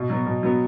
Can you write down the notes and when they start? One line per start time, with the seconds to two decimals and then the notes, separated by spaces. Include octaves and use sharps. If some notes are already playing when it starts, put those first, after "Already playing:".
Already playing: B2
0.10 F#3 B3
0.26 B2
0.43 F#3 B3